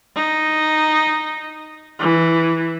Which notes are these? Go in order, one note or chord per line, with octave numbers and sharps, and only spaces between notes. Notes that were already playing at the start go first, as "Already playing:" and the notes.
D#4
E3